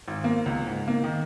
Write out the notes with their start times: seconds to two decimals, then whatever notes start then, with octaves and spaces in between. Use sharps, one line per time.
0.08 G#1
0.24 A#3
0.46 C#2
0.67 G#2
0.88 A#3
1.04 D#3